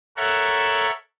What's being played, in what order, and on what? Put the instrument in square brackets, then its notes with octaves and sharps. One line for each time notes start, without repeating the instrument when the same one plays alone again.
[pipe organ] A4 A#4 C#5 E5 F#5